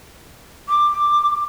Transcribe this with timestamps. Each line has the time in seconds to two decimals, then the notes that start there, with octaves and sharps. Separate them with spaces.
0.69 D6